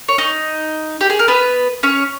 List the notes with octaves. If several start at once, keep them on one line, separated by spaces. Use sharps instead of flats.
C#5
D#4 D#5
G4
G#4
A#4
B3 B4
C#4 C#5